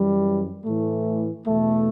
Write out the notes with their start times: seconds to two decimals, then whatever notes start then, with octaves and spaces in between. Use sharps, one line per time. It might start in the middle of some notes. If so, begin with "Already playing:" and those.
Already playing: F#2 E3 G3
0.65 A2 E3 A3
1.46 E2 B2 A3